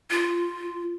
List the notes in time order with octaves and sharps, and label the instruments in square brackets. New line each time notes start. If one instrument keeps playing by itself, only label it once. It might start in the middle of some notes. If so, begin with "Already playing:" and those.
[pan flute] F4